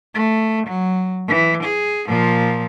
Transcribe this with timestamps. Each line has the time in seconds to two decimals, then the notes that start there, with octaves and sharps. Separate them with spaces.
0.15 A3
0.67 F#3
1.28 E3
1.63 G#4
2.07 A#2 F3